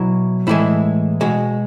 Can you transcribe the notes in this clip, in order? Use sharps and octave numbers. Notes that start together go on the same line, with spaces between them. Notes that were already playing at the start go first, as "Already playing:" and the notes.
Already playing: B2 F#3 E4
A2 E3 G#3 E4
B2 G#3 F#4